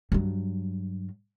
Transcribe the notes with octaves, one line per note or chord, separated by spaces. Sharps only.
G2 F#3